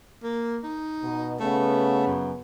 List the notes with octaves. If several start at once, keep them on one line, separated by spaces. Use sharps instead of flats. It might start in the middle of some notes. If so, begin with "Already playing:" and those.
A#3
D#4
B2
C#3 A3 B3
F#2